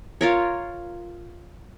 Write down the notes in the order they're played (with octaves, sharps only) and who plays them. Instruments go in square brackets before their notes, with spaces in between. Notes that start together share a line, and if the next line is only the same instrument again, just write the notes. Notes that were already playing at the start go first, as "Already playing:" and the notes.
[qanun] F4 A#4 C#5